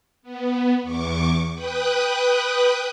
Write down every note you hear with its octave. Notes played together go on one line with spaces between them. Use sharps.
B3
E2 C#6 D6
B4 G5 D#6 F#6